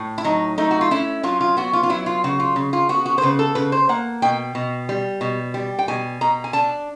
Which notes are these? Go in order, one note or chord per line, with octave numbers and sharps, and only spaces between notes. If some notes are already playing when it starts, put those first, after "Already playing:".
Already playing: A2
E4
F#3 D#4
A3 D#4
F#4
F4
C#4 E4
F#3 F4
F4
B3 F#4
F4
F4
F#3 E4
F4
C#3 F#4
F4
C#3
F4
B3 F#4
F#4
C5
C#3 B4
A4
C#3 B4
C5
A#3 F#5
B2 G5
B2
G3
B2
G3
G5
B2 G#5
B2 A#5
G#5
D4 A5